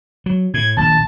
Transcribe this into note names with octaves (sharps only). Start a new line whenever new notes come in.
F#3
A2 G#6
D#1 A#1 A5